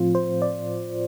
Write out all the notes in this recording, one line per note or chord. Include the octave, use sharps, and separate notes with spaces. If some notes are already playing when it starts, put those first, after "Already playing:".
Already playing: A2 F3 C4 F4
C5
D5